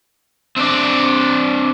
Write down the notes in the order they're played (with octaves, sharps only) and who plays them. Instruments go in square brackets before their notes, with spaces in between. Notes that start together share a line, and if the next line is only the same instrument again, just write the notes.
[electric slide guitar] C4 D4 D5